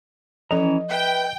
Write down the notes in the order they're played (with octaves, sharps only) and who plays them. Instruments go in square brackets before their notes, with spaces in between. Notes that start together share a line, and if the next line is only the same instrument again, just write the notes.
[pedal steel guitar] E3 C#4 A#5 [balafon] F3 A4 [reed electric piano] D#5
[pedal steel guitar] B4 E5 [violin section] G5